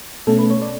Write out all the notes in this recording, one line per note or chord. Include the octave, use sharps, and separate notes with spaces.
B2 A3 C#4 A4
B4
C#5
D5